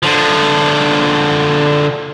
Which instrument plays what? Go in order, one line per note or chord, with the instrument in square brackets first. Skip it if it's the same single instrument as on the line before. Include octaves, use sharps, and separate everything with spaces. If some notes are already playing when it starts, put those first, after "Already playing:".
[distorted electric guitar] D3 F3